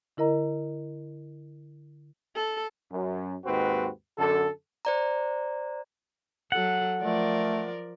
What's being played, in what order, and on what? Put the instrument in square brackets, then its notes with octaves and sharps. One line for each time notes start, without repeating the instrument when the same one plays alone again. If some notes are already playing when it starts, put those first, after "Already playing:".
[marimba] D3 E4 A#4 D#5 A#5
[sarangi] A4
[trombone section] F#2
D#2 G#2 C4 F#4 B4
F#2 D3 A4
[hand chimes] C5 D5 A#5
[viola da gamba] F#3 A4 [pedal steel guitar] F#5
[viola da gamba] F3 A#4 D5 [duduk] A3